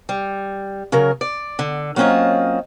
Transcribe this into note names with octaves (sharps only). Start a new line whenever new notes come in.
G3
C#3 F#3 A#4
D5
D3
F#3 A#3 C4 C#4 F4 D#5